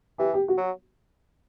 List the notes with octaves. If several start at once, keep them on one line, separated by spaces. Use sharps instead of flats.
E3 G4
G4
F#4
F#3